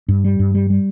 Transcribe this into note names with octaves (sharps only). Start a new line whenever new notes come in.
G2
G3
G2
G3
G3